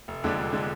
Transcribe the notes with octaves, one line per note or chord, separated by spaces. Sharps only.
F1
F2 D3 G#3 D4
F1
D3 G#3 D4